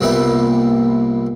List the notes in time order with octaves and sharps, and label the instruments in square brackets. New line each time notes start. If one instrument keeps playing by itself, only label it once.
[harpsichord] C2 A#2 G3 B3 D#4 E5